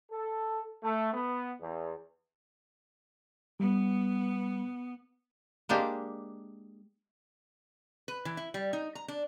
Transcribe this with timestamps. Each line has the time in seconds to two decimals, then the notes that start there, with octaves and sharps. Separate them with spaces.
0.11 A4
0.83 A3
1.14 B3
1.60 E2
3.60 G3 B3
5.69 G#3 A#3 D4 G4
8.08 B4
8.25 E3
8.37 E4
8.54 G3
8.73 D#4
8.95 A#5
9.08 D4